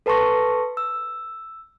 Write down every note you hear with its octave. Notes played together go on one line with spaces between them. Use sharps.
A4 B4 A5 C6 C#6 A#6
E6